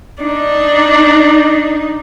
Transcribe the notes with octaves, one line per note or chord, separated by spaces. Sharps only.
D4 D#4